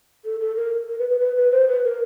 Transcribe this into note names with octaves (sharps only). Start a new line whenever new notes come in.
A4
A4
A#4
A#4
B4
B4
B4
B4
C5
B4
A#4